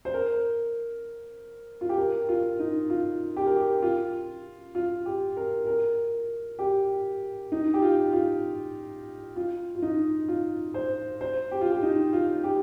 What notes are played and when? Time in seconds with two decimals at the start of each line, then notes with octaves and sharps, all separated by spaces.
0.05 C5
0.14 A#4
1.81 F4
1.89 G4
1.98 A#4
2.29 F4
2.59 D#4
2.90 F4
3.37 G4
3.46 A#4
3.56 G4
3.82 F4
4.75 F4
5.06 G4
5.37 A#4
5.67 A#4
6.59 G4
7.52 D#4
7.74 G4
7.82 F4
8.13 F4
9.36 F4
9.75 F4
9.82 D#4
10.29 F4
10.74 C5
11.21 C5
11.51 G4
11.61 F4
11.72 G4
11.82 D#4
12.13 F4
12.44 G4